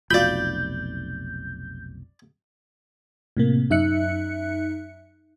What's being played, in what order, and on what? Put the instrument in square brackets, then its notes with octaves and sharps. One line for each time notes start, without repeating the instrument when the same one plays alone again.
[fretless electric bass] F1 B1 [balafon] F4 F#4 F5 [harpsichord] D5 B5 [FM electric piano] G6
[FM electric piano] A2 C3 A#3
F#2 D#4 E5 F#6 C#7